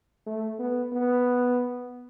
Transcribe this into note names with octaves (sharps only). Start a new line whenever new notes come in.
A3
B3
B3